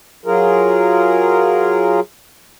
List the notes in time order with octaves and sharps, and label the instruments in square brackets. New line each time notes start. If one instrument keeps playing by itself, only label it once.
[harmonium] F#3 F4 G#4 A#4